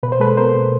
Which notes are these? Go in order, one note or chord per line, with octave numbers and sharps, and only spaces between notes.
B2 B4
C5
G#3 A4 B4
B3 A#4 C5
B2